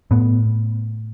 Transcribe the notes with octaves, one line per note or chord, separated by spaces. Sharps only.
A2 B3